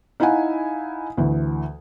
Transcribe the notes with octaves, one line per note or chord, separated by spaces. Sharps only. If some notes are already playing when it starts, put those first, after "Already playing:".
D#4 E4 F5 F#5 G#5
D2 E3